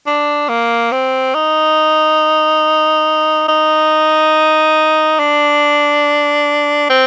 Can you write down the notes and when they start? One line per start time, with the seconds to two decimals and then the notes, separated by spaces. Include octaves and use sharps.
0.07 D4
0.49 A#3
0.92 C4
1.35 D#4
3.48 D#4
5.19 D4
6.90 C4